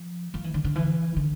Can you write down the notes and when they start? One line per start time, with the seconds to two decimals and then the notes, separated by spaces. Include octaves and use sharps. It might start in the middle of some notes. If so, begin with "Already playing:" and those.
Already playing: F3
0.34 F3
0.44 E3
0.54 D3
0.64 D3
0.75 E3
1.16 D3